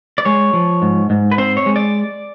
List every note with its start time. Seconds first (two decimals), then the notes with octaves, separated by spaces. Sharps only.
0.18 D5
0.25 G#3 C#5
0.53 F3
0.82 G#2
1.10 G#2
1.32 B4
1.38 C4 C5
1.57 C#5
1.66 G#3
1.76 D5